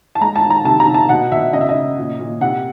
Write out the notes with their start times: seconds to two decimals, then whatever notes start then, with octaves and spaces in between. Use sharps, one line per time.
0.15 A5
0.21 G#3 A#5
0.36 A5
0.43 D#3
0.50 A#5
0.65 C3 A5
0.80 A#5
0.87 C3
0.94 A5
1.09 B2 F#5
1.32 B2 E5
1.53 C#3 D#5
1.61 E5
1.69 D#5
1.75 C#3
1.97 A#2
2.20 A#2
2.41 C3 F#5